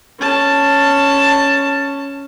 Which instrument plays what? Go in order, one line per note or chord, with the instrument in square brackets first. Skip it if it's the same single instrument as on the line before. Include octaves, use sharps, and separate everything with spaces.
[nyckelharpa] C#4 A5